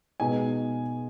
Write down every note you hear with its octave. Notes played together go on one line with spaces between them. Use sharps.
B2 G#3 D#4 G#5